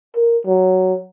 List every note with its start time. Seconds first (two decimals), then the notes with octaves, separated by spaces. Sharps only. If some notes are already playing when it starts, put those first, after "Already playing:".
0.16 A#4
0.46 F#3